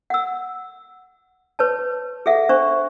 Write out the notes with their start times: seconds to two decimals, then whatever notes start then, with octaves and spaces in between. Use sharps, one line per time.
0.10 F#5 E6
1.59 B4 C#5 A5
2.26 G#4 A4 E5 F#5
2.49 D4 C5 C#6